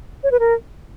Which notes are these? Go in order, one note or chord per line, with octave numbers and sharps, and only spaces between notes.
C#5
B4
A#4